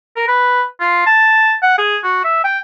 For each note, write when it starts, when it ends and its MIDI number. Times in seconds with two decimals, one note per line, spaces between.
0.16 0.28 70
0.28 0.64 71
0.80 1.04 65
1.06 1.54 81
1.63 1.76 78
1.78 1.97 68
2.04 2.21 66
2.24 2.44 76
2.44 2.59 79